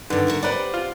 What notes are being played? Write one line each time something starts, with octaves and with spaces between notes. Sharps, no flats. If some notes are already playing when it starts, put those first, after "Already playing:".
G2 D3 D#3
F#4 A#4 E5
G4 B4 C5 D5 F#5
F4